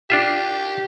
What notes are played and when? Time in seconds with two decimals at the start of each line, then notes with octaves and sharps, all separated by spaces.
0.10 D4 F4 G4 E5